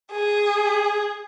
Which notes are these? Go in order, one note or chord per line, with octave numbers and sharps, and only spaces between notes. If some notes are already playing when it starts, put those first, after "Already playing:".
G#4